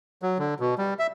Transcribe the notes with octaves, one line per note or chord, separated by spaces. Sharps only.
F#3
D3
B2
G3
E5